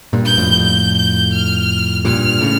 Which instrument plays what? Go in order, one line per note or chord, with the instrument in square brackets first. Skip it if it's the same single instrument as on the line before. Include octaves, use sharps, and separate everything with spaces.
[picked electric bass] G2 A#2
[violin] G6
[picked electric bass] F2 A2
[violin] G6
G6
F6
[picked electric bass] G2 A#2 [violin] F6
[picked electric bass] A2 C#3